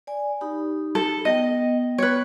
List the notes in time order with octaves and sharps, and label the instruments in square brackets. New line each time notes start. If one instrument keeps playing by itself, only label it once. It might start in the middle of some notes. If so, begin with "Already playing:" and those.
[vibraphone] D5 G#5
D#4 G4 B5
[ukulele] A4
[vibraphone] B3 G5 [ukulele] D#5
[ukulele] B4 C#5